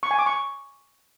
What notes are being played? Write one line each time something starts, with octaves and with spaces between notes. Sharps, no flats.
C#6
G#5
D6
C#6